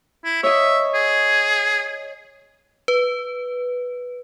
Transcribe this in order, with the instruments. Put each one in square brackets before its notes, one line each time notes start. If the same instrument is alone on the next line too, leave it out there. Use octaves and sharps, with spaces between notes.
[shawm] E4
[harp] C#5 D#5 [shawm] E5
[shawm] G#4
[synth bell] B4